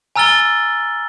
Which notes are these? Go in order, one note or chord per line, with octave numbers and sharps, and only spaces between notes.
G#5 A#5 E6 F6 A6 G7